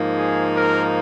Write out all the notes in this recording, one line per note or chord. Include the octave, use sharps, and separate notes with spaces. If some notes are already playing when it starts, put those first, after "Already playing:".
Already playing: G#2 F3 A#3 D#4
G#4
A#4